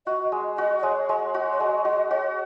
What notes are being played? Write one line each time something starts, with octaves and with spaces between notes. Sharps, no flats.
F#4 D#5
G#3
F#4 D#5
D#5
G#3 C#5
G#3
F#4
C#5
G#3 D#5
F#4 D#5
F#4 C#5